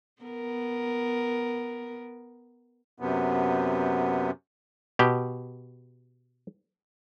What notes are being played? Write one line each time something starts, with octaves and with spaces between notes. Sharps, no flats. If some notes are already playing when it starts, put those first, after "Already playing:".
B3 A#4
F#2 C3 B3
B2 G4